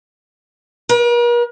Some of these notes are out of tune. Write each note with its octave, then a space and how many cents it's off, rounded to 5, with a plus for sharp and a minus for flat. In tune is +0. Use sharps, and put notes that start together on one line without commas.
A#4 +45